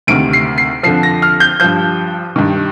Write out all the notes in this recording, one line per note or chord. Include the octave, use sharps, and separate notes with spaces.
D2 C3 D#3 D7
C7
C7
F2 D3 F3 C7
A#6
F6
G6
G2 F3 G6
G2 D#3